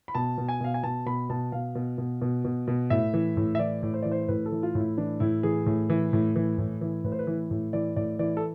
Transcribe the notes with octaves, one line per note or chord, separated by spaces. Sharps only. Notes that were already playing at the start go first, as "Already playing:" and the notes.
B5
B2 A5
B2
G#5
B2 F5
G#5
B2 A5
B2 B5
B2 A5
B2 F5
B2
B2
B2
B2
B2
A2 E5
E3
A2
E5
E3 D5
A2
C5
E3 D5
C5
A2 B4
A4
E3
F4
A2
E4
E3 D4
A2 E4
E3 G#4
A2
E3
A2
E3
A2
E3
A2 B4
C5
B4
E3
A2
E3 D5
A2 D5
E3 D5
A4